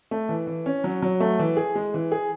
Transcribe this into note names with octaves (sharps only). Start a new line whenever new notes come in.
A3
E3
E3
C#4
F#3
F#3
A3
E3
G#4
G#3
E3
G#4